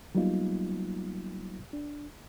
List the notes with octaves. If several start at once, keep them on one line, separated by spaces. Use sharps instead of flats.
F#3 G3 A#3 B3 D#4 F4
D4